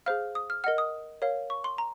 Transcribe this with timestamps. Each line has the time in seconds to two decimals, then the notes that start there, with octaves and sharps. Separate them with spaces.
0.06 G#4 C5 F5 F6
0.35 D#6
0.50 F6
0.64 A#4 D#5 F#5 F6
0.78 D#6
1.22 A#4 C#5 F5
1.50 C#6
1.64 C6
1.78 A#5